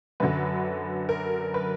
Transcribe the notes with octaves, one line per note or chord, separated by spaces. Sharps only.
F#2 D3 F#3 B4
A#4
B4